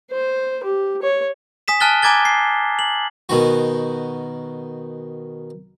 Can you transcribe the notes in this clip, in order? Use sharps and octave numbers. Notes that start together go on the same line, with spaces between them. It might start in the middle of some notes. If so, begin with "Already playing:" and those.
C5
G4
C#5
G#5 D#6 B6 E7
G#5 A5 F6 F#6 A6 G7
G#5 A#5 D6 G#6 A6 G7
C7
F#7
B2 D#3 F#4